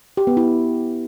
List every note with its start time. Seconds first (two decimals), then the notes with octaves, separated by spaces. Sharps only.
0.17 G4
0.27 B3
0.37 E4